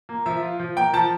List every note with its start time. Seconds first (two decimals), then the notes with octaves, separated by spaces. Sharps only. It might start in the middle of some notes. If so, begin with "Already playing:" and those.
0.09 A#3
0.26 F3 E5
0.42 F4
0.59 F3
0.76 A#3 G5
0.93 F3 A5